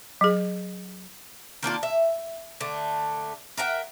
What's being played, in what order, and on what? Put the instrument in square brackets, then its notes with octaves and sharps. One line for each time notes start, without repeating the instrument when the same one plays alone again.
[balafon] F#3 G#4
[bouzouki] D#3 A#3 D4 F4
E5
D3 A3
A#4 E5 F#5 G5